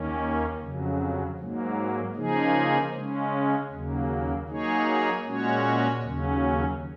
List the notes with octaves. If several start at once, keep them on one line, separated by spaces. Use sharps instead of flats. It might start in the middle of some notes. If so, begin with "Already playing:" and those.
Already playing: D#2 D#3 A#3 C#4
F2 C#3 F#3
G#2 F#3 A#3
C#3 F3 A#3 D#4 G#4
C#3 G#3 C#4
D#2 C#3 F#3 A#3
F#3 A#3 D#4 G#4 C#5
A#2 G#3 C#4 F#4 C#5
D#2 C#3 F#3 C#4